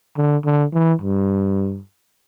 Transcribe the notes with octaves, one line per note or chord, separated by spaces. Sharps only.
D3
D3
E3
G2